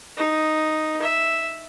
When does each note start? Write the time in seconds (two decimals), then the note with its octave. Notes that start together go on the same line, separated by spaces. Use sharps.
0.17 D#4
1.02 E5